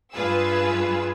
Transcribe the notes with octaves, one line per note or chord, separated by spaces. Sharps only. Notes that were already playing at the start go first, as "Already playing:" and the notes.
G2 F4 G#4 B4 E6